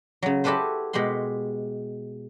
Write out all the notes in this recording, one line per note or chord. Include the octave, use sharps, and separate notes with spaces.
C#3 F#3
E4 F#4 G4 A4 B4 C5
B2 G#3 G4 B5 C6